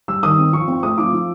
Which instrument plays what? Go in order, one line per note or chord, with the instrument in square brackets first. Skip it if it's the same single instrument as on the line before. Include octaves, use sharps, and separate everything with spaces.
[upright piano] G3 E6
D#3 D#6
C4
F3 C#6
C4
A3 D#6
F3 D6
F3